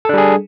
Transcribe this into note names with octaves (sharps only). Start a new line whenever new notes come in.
G3 D4 G#4 A4